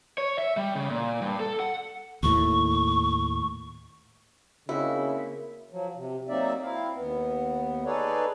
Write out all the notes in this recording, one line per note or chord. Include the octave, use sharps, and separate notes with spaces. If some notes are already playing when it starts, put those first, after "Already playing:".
C#5
E5
G3
C#3
A#2
G2
A4
F#5
D#2 A2 C#6
C#3 A#3 C4 D#4 E4 F#4
F3 F#3
C3
F#3 A#3 C4 D#4 D5 E5
C4 E4 F5
D#2 B3
D#4 G#4 A4 B4 C#5 D5